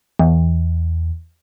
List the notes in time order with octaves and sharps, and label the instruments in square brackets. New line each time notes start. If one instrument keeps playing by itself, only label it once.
[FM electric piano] E2